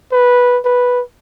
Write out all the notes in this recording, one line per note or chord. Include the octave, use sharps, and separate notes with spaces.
B4
B4